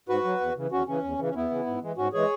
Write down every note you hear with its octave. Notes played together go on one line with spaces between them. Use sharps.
G#2 F#4 B4
F#3
E2
C#3 E3
E2 C#4 F#4
C#3 E3 C#4
E2
C#3 E3
C#4
E2 B3 E4
C#3 E3
G#2
E3 G#3
G#2 C#4 F#4
E3 G#3 G#4 C#5